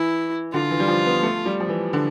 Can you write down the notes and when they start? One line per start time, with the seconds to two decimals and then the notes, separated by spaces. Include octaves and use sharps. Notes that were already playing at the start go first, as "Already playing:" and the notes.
Already playing: E3 E4
0.53 D3 F4
0.71 E3
0.80 G3
0.88 F3
1.06 B3
1.23 A3
1.46 G3
1.60 F3
1.69 E3
1.93 D3